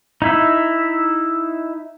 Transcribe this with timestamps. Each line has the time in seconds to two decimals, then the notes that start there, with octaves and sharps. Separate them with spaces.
0.22 D#4 E4 E5